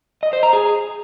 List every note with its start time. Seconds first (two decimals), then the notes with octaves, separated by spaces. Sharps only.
0.23 D#5
0.33 C5
0.43 A#5
0.53 G#4